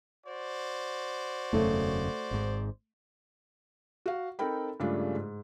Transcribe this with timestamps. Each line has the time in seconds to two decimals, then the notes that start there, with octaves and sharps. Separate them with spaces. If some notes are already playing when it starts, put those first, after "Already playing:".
0.26 F#4 C5 D5
1.53 E1 F#2 C#3 A3
2.31 G#1 G#2
4.06 F#4 F5
4.39 C4 D#4 A4 A#4 G5 B5
4.80 G2 C#3 G#3 A3 D4 F4
5.15 G#2